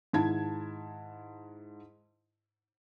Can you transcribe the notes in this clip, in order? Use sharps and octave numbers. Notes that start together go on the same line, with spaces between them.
G#2 D#3 E4 A5 G#6